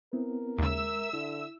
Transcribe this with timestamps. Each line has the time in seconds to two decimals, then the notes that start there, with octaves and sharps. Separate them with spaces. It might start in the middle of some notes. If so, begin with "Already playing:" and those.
0.13 B3 C4 E4 A#4
0.58 D#2 C#3 G#3 E5 E6
1.13 D3 E4